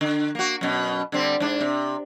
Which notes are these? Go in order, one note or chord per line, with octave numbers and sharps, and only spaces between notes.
D3
A#3 F#4
F#2 B2
D3 G3 C4
G#2 D4
C3